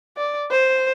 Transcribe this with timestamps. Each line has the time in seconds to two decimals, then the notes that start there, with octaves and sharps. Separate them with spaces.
0.17 D5
0.51 C5